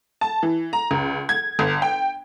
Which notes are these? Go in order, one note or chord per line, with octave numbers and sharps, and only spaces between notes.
A5
E3
A#5
C#2
G#6
G1
G5